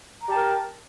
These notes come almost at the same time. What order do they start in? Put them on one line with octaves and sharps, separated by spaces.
A#5 G4 A5 A#4